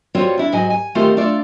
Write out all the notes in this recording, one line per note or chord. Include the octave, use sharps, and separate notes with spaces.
G3 C4 F4 F#4 C#5
D4 E4
G#2 F#3 D#5 G#5
G#5
D#3 A3 C4 D#4 F4 G4
A3 D4 F4 D5